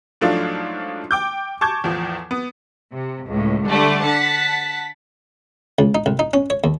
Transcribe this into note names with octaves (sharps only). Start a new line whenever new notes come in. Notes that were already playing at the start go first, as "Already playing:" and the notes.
G#2 F3 F#3 A3 D4 F4
G5 D6 G6
A5 C#6 D6 G6 G#6
E2 A2 F3
B3
C3
C#2 A2
D3 G3 A3 D5
F#5 A5 B6
C#2
D#4
C2
D#4
C#4
C#5
D#2